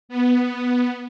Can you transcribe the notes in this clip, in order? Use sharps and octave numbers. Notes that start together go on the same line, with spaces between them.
B3